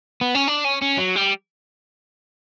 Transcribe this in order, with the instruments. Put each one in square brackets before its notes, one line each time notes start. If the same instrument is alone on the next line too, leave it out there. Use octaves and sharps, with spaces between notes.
[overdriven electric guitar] B3
C#4
D4
C#4
C#4
F#3
G3